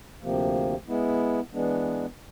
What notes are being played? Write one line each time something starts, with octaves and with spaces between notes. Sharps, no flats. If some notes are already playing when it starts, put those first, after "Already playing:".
D2 C3 F3 A#3
G#3 B3 E4
E3 G#3 B3 D4